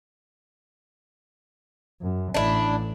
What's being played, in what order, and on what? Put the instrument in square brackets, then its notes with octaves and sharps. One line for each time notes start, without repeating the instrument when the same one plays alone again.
[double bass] F#2
[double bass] A1 [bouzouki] D4 E4